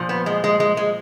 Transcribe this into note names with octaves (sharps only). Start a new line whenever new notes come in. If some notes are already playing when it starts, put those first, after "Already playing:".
Already playing: A#2 F3
B3
G#3
G#3
G#3
G#3